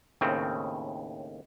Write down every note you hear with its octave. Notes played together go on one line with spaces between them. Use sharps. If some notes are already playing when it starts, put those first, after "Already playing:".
D#2 A2 C#3 C4